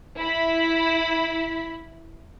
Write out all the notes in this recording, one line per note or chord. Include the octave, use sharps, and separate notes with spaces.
E4 B5